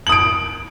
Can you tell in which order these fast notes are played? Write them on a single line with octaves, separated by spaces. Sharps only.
F#7 D#6 D7